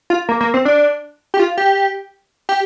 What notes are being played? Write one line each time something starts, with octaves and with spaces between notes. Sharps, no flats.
F4
A#3
A#3
C4
D4
G4
F4
G4
G4